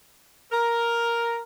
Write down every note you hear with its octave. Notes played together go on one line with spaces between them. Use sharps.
A#4